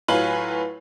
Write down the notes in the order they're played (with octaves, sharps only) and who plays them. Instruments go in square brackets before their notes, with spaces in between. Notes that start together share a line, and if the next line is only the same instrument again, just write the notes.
[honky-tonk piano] A2 F#3 F4 B4 G#5 F#7